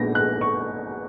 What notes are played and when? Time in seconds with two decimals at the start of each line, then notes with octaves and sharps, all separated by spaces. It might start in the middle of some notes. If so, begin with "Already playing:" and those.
Already playing: A#1 A#2 G#3 B3 D#4 A#6
0.15 F#6
0.41 C#6